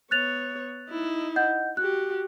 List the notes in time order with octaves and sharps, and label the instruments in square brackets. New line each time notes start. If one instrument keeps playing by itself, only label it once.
[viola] B3 C#5 [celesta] F#6 A6 F7
[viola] D#4 E4
[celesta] D#5 F#5 G6
[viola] F#4 G4 [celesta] F#6